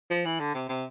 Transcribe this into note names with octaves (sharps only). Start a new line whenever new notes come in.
F3
E3
D3
C3
C3